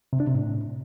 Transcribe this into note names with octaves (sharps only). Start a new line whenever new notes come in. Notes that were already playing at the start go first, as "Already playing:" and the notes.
C3
D4
C3
A2